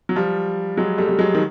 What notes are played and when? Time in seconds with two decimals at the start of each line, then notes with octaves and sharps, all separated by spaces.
0.09 F#3
0.16 F3 G3
0.77 F#3 G#3
0.98 G3 A3
1.09 G3
1.19 F#3 G#3
1.35 D#3